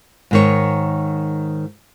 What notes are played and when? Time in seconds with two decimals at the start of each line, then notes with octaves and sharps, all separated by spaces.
0.31 G#2 D#3 C#5